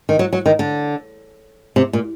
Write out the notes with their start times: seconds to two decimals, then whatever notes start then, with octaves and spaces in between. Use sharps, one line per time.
0.09 D#3
0.19 F#3
0.33 F#3
0.46 D#3
0.59 D3
1.76 C3
1.93 A#2